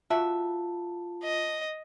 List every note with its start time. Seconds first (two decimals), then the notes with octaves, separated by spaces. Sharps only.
0.10 F4 F#4 E5 A5
1.23 D#5